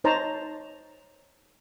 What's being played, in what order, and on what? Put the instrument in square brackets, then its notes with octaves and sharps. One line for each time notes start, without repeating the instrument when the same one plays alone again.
[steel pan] D#4 C5 C#5 A5 A#5